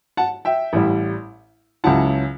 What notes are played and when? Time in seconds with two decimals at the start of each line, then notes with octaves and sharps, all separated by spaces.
0.17 F#5 A5
0.45 E5 G5
0.73 A1 A2 G3
1.84 C#2 C#3 F#3 C#4 E4 F#5 A5